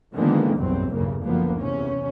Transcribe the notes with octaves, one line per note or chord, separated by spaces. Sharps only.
D3 D#3 F3 G#3 A#3 B3
F#1 B1 E2 G2 F#3 C4
B1 E2 G2 C#3 A#3
F#1 D2 F3 A#3 B3
E2 C3 C#4